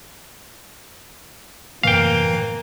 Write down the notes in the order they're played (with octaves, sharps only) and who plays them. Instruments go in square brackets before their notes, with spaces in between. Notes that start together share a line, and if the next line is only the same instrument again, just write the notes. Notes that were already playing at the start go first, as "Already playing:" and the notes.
[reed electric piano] F#2 A2 C3 [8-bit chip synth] E3 [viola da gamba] A#3 [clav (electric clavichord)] F5 G5